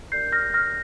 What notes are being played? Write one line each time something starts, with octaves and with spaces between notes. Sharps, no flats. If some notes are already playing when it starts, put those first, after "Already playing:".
D4 G4 A#4 D5 G6 C7
F6 A#6
F6 A#6